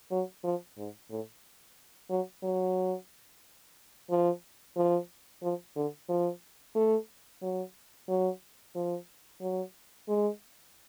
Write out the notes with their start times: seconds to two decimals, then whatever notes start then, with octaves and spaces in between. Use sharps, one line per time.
0.11 F#3
0.44 F3
0.77 G#2
1.10 A2
2.10 F#3
2.44 F#3
4.10 F3
4.77 F3
5.43 F3
5.76 D3
6.09 F3
6.75 A3
7.42 F#3
8.08 F#3
8.75 F3
9.41 F#3
10.08 G#3